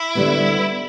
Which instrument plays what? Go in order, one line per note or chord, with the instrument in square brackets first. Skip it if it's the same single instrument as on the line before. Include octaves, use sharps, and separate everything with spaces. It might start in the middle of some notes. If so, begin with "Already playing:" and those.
Already playing: [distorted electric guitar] E4
[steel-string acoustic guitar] D2 D3 G3 B3